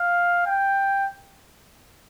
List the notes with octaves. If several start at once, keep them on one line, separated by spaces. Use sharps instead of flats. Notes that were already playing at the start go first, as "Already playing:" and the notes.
Already playing: F5
G5